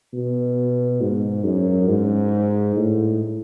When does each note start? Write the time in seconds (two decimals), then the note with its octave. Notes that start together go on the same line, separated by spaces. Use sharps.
0.13 B2
1.01 G#2
1.44 F#2
1.88 G#2
2.76 A2